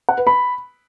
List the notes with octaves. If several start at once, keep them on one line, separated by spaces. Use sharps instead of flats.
F#5
B4
B5